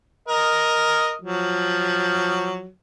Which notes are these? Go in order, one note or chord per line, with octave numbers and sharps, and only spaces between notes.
A#4 D#5
F3 F#3